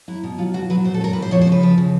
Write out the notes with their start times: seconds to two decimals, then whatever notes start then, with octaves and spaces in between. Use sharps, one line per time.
0.08 F#3 E4
0.23 B2
0.38 F#3 F4
0.54 B2 F#4
0.70 F#3 B4
0.84 A#2 C5
0.94 A4
1.01 F#3 A#4
1.13 A#2 B4
1.22 C5
1.31 F3 C#5
1.41 C5
1.47 C#3 B4
1.63 F3
1.78 C#3